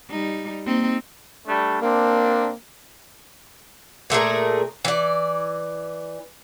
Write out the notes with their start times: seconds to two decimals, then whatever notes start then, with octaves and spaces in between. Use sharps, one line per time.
0.10 G3 D#4
0.67 A#3 C4 D#4
1.47 G3 A3 D4
1.82 A#3 C4 D4
4.10 A#2 A3 G#4 A#4
4.85 E3 D5